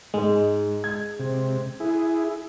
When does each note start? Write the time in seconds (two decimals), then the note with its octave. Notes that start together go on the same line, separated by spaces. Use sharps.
0.14 G#2 G#3
0.84 G#6
1.19 C3
1.80 E4 G#4